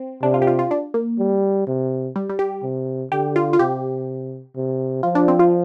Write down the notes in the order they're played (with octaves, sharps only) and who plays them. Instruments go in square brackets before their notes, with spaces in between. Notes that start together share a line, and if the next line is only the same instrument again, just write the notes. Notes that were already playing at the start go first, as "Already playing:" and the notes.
Already playing: [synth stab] C4
[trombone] C3 [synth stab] D4
[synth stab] F4
G4
F4
F4
D4
A#3
[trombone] G3
C3
[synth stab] G3
G3
G4
[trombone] C3
[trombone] D3 [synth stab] G4
[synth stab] F4
F4
[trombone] C3 [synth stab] G4
[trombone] C3
[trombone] F3 [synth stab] F4
[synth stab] D4
C4
F4